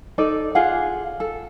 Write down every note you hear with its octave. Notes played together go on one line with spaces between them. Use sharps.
D#4 A4 D5
F4 G#4 F5 F#5
A4